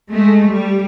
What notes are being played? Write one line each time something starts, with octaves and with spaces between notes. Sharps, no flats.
G#3 A3
G3